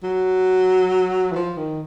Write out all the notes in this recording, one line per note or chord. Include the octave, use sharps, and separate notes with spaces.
F#3
E3
F3
D#3